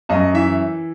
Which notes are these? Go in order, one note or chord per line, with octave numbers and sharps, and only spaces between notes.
F#2 D#5
E3 E5